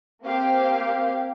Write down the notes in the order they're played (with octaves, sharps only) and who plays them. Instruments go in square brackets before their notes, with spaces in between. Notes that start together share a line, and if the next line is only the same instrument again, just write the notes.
[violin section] A#3 C4 G4 F5